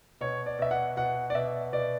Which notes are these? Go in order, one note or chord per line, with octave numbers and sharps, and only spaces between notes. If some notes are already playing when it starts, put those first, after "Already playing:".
B2 C#5
D5
B2 E5
F#5
B2 F#5
D5
B2 E5
B2 D5